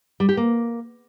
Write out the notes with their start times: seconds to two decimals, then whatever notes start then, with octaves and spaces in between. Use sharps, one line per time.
0.20 G3
0.29 G4
0.37 A#3